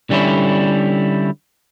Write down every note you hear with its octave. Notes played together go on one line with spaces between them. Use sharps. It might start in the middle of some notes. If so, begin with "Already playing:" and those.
D3 G3 C#4 E4